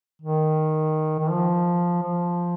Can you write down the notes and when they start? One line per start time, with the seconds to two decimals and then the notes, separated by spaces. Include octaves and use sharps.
0.22 D#3
1.19 D#3
1.30 F3
2.03 F3